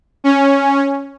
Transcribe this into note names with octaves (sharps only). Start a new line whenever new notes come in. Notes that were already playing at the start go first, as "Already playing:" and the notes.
C#4